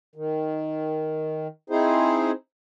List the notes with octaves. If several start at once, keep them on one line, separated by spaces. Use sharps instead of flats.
D#3
C4 D#4 E4 G#4 C5